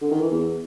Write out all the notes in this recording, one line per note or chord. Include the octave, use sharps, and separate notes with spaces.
D3
D#3
E3
E2